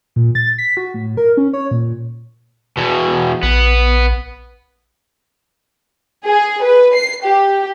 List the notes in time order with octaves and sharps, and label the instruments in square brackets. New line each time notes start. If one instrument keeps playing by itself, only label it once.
[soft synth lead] A#2
A6
B6
F#4
A2
A#4
C#4
C#5
A#2
[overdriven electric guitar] E2 B2
[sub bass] A#1 [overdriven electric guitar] B3
[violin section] G#4
B4
C7
G4